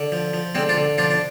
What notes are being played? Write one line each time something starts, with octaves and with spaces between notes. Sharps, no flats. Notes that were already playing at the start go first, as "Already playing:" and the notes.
Already playing: D3
F3
F3
D3 G#3 C4
D4 F4
D3
F3 D4 F4
D4